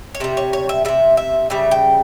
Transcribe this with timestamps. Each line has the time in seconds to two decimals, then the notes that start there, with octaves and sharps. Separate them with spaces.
0.15 C#5
0.20 C3 G3 E5
0.37 C#5
0.53 C#5
0.69 E5
0.85 C3 G3 E5
1.17 E5
1.50 C#3 G3 E5
1.71 G5